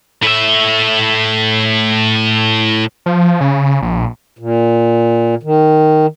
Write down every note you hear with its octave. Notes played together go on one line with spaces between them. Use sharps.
A2 E5
F3
C#3
A#1
A#2
D#3